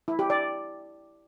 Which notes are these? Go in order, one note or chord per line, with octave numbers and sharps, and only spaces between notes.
E4
G4
D5